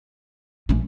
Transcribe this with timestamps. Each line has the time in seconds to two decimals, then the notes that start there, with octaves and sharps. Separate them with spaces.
0.69 A#1 A3 C#4